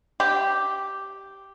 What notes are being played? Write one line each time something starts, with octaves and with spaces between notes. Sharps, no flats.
G4